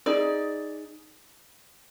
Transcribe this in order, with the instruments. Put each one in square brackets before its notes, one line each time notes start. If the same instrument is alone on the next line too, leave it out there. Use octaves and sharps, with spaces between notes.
[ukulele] D#4 G#4 D5